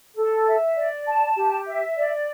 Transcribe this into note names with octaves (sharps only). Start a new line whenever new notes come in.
A4
E5
D5
A5
G4
E5
D5